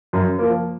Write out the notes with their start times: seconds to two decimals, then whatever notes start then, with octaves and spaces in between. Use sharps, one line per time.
0.13 F#2
0.39 F3 A#3